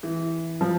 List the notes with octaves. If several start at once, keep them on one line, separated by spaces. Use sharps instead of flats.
E3
F3